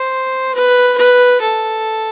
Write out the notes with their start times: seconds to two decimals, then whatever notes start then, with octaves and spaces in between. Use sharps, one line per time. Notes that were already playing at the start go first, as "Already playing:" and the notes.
Already playing: C5
0.55 B4
0.98 B4
1.41 A4